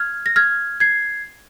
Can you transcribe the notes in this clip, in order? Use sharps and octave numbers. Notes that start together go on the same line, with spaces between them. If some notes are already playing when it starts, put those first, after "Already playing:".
Already playing: F6 G#6
A#6
F6 G#6
G#6 C7